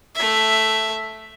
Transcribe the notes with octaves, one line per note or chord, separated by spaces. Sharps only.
A3 E5